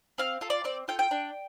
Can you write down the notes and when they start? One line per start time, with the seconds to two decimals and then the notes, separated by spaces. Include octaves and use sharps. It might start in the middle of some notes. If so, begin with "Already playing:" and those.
0.18 C4 F5
0.41 F4 A4
0.50 D5
0.64 C4 D5
0.88 F4 A4 G5
0.99 G5
1.11 D4